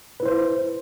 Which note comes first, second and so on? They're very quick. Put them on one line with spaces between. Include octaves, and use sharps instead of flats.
B4 E4 C5